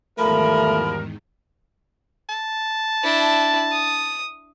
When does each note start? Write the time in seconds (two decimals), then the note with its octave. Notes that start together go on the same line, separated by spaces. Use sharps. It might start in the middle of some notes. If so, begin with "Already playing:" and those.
0.19 E2 G#2 D#3 F3 G3 A3 A#4 B5
2.29 A5
3.03 D4 E4
3.72 D#6